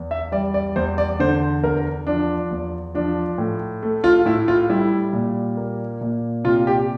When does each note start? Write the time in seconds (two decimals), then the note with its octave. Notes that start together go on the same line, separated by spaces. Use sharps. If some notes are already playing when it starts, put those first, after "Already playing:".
Already playing: E2
0.11 E5
0.32 G3 D5
0.54 D5
0.76 E2 C5
0.98 D5
1.20 D3 C5
1.64 E2 A#4
2.07 F3 D4
2.51 E2
2.94 F3 D4
3.38 A2
3.83 A3
4.04 F4
4.25 A2 E4
4.48 F4
4.69 G3 E4
5.13 A#2
5.57 A#3
6.01 A#2
6.44 C3 F4
6.67 G4